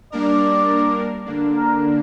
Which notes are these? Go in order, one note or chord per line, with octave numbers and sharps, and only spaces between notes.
G3 A#3 D4 A#4 D5
D3 A#3 D4
A#4